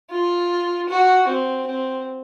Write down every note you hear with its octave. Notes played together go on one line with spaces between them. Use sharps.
F4
F#4
C4
C4